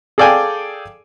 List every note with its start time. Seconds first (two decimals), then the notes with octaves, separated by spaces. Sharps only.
0.18 G#4 A4 D5 F5 G5 G#5